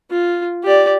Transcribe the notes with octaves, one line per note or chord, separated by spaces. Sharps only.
F4
G4 D5